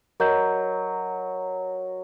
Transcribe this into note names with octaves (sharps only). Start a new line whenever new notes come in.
F#3 A#4 D#5 G6